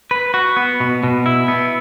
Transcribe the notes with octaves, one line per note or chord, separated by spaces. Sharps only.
B4
F#4
B3
B2
B2
E4
B3